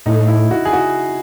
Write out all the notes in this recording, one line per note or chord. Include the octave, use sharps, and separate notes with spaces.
A2 D#4
E4
F#4
G#4
F#4